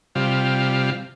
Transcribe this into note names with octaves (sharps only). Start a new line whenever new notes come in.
C3 G3 F4